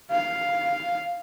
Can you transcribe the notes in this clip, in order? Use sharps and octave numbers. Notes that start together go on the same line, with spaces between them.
F5